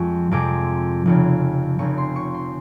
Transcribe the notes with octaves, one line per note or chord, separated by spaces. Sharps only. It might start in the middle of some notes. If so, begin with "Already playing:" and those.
Already playing: F2 F3 G#3 C#6
F2 C3 F3 G#3 D6
F1 F2 C#3
F1 F2 C#3 C#6
C6
C#6
C6